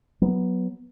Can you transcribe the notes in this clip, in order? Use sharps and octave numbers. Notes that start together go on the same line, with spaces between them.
F#3 B3